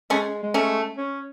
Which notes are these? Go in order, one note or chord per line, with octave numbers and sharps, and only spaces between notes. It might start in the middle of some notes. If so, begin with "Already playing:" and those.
G#3 A3 C#4
G#3
A3 C#4
C#4